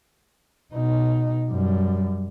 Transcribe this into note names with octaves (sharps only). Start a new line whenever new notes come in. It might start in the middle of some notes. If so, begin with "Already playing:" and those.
B2 D#4
F#2 G3